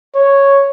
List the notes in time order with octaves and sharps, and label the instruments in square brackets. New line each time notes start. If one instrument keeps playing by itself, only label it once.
[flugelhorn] C#5